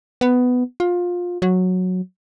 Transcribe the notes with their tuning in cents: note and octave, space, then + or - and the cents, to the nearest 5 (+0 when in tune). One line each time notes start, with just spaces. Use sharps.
B3 +10
F4 +20
F#3 -10